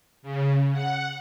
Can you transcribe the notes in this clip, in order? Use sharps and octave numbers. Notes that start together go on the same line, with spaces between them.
C#3
F#5